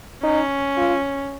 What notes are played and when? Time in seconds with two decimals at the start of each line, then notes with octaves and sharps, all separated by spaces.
0.23 C#4 D#4
0.77 F4